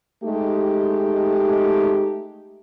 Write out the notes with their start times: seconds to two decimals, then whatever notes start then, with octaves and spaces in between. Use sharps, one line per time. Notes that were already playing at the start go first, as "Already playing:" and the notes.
0.24 G#3 A3 D#4 G4